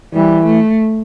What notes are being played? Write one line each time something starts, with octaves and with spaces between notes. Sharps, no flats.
E3 G3
A3